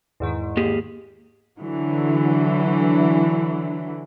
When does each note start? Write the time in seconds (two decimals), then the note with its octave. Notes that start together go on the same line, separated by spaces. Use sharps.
0.20 E2 G#2 D#3
0.57 A#3 G4 G#4
1.59 D3 E3 F#3